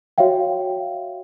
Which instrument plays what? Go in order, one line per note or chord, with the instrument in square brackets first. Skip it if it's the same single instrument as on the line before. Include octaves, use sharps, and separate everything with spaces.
[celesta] F#4 C#5 E5 F5 G5